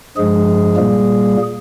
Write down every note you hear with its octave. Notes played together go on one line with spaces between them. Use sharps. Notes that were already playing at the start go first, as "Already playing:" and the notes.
G2 F3 G#3 G#4
A#2 G3 A#3